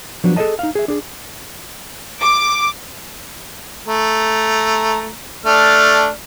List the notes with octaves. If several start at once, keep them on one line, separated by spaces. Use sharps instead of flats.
F3 F#3 B3 D4 F#4
G#4 A4 C5 C#5 D#5 A5
D#4 F5
G#4 E5
D4 G#4
D6
A3 A#5
A3 D4 F6